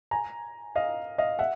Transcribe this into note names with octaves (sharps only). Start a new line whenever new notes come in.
G#5 A#5
D#5 F5
D#5 F5
E5 F#5